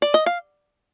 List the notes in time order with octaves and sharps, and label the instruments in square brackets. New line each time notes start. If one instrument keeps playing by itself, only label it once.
[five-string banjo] D5
D#5
F5